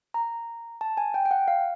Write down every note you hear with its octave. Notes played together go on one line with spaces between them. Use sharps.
A#5
A5
G#5
G5
G5
F#5
F5